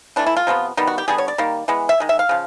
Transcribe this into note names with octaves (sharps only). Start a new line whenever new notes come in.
E3 A3 D4
E4
F4
C3 F3 G#3 B3
D#3 G3 B3
F#4
G4
D3 G3 B3 G#4
C#5
D5
D#3 G3 A#3
E3 G#3 B3
E5
D#3 G#3
E5
F5
C#3 F3